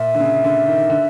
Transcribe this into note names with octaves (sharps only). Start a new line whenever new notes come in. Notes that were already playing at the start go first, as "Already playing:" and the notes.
Already playing: A#2 E5
D3
C#3
D3
D#3
D3